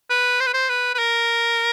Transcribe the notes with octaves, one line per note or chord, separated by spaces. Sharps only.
B4
C5
B4
C5
B4
B4
A#4